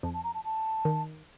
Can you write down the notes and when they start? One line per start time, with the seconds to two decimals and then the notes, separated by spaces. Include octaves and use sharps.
0.03 F2 A5
0.14 A5
0.24 A#5
0.34 A5
0.44 A5
0.85 D#3